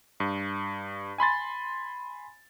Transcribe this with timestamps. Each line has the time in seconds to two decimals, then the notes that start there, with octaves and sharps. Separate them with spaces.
0.20 G2
1.18 G#5 B5 C6 A6